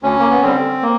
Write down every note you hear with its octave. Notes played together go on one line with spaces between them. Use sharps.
D2 C#4
A#3
B3
D3 G3 C4
A#3